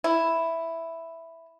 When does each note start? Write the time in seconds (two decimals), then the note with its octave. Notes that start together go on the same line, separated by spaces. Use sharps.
0.04 E4